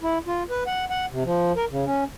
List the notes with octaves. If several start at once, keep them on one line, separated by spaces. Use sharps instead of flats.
E4
F4
B4
F#5
F#5
C3
F3
A#4
C#3
C#4